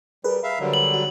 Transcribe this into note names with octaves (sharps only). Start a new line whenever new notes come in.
G3 G#4 A#4 B4
E5 F5
D3 F#3 G3
F#7
F#4